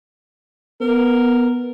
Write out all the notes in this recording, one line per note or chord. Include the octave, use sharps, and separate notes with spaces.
B3 A#4